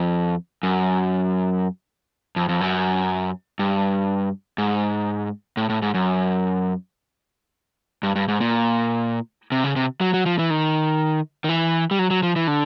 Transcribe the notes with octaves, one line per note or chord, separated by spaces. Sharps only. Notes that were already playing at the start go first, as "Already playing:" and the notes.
Already playing: F2
F#2
F2
F2
F#2
G2
G#2
A2
A2
G#2
F#2
G2
G2
G#2
A#2
C3
C#3
C3
F#3
F#3
F3
E3
D#3
D#3
E3
G3
F#3
F#3
F3
E3
D3